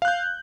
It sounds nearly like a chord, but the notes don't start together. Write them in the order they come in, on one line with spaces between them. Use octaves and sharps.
F5 F#6 G6